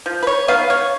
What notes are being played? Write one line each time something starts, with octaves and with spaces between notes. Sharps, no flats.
F3
B4
C#5
B3 D#4 F5
C#5